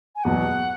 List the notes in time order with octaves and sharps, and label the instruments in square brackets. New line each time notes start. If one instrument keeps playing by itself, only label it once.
[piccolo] G#5
[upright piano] E2 B2 F#3 [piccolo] F#5